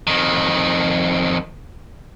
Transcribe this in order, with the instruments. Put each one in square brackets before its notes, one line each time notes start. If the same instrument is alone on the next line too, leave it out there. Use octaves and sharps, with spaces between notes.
[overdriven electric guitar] F2 D#3